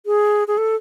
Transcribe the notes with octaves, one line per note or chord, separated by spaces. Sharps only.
G#4
G#4
A4